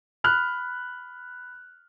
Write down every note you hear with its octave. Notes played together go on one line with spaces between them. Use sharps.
B5 F6 F#6